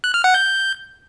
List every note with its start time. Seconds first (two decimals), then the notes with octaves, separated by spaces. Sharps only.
0.04 F#6
0.14 F6
0.24 F#5
0.34 G6